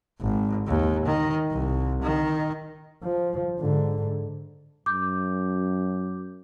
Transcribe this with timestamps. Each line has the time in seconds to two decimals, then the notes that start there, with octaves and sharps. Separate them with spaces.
0.20 G#1
0.67 D#2
1.06 D#3
1.50 C2
2.02 D#3
3.04 F3
3.60 G#2 D3
4.86 F#2 D6 G6